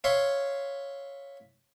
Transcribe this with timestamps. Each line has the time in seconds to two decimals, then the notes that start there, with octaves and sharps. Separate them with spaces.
0.04 C#5 E5 F5 C6